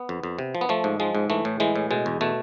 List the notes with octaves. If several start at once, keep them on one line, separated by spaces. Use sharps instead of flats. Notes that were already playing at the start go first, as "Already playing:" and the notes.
Already playing: B3
F2
F2
C3
F3
B3
F3 A3
G#2
F3 G#3
G#2
E3 A3
A2
E3 G#3
A2
B2 G#3
E2
B2 A3